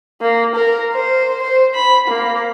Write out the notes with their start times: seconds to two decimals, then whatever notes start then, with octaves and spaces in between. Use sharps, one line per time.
0.21 A#3
0.55 A#4
0.94 C5
1.42 C5
1.75 B5
2.08 A#3